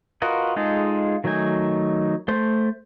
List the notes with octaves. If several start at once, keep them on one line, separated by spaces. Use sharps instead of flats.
F4 F#4 A#4 B4 D#5
G#3 D#4 F4 G#4 A4
D#3 F#3 A3 D#4 G#5
A3 C5 C6